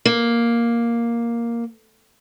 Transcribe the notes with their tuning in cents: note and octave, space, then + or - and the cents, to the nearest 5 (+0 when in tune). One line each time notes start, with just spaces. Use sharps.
A#3 +5